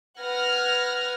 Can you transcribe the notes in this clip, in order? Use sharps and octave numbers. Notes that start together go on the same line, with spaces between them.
B4 F#5 F6 G#6 A#6